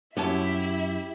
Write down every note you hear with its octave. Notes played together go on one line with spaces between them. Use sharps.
F#2 C#4 E4 G4 E5 A5